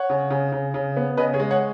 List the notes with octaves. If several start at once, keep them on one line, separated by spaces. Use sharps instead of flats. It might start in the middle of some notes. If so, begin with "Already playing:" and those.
Already playing: C#5 F#5
C#3
C#3
C#3
C#3
B3
C#3 B4 D#5
G#4 C#5
G#3
C#5 F#5